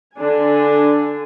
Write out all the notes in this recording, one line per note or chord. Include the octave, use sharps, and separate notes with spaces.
D3 D4 G#5